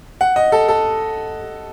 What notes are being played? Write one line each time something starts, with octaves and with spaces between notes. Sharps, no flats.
F#5
D#5
A4
A4